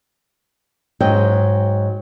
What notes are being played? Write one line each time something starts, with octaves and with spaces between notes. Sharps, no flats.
G#2 F#3 G#4 D#5 G5